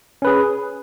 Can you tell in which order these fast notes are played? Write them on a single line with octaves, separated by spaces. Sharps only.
C#4 B4 G#4